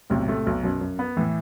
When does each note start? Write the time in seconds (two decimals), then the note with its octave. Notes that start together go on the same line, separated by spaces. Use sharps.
0.10 B1 A2 C3
0.28 A2 C3 A3
0.46 B1 B2
0.63 F#2 B2
0.81 F#2
0.99 B3
1.17 A2 E3